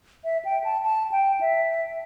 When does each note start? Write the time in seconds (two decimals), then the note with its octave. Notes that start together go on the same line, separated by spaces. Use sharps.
0.24 E5
0.45 G5
0.64 A5
0.83 A5
1.12 G5
1.41 E5